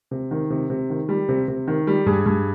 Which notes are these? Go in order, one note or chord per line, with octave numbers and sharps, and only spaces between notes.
C3
D#3
C3
C3
D#3
G3
C3
C3
D#3
G3
G2 G#4
G2